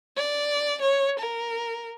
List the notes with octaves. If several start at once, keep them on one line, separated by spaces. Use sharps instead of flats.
D5
C#5
A#4